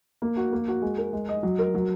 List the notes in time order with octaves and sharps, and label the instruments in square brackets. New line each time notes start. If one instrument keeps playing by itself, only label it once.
[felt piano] A#3
F#4
A#3
F#4
G#3
A#4
G#3
D#5
F#3
A#4
F#3